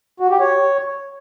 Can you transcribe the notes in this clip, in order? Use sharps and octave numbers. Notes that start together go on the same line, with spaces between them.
F#4
G4
C#5